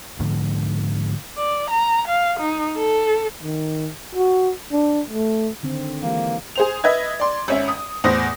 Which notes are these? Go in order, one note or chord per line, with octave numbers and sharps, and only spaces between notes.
G#2 D3 F3 A#3
D5
A#5
F5
D#4
A4
D#3
F#4
D4
A3
D3 D#3 C4
E3 G#3 A#3 G4
G#4 C5 F7
B4 D#5 E5 G#6
D5 C6
G#1 C#4 E5
D#6
E2 A2 C5 D#6 A#6